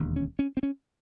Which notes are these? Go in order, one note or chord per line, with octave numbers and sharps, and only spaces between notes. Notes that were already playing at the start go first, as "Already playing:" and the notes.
Already playing: E1 D#2 D3
C#4
C#4
C4
C#4